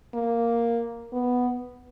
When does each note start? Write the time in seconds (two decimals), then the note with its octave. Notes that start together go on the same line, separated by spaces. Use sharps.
0.14 A#3
1.13 B3